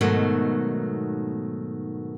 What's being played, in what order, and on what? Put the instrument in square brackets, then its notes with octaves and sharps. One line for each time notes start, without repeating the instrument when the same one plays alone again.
[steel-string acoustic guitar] G#2 B2 D#3 F#3 A3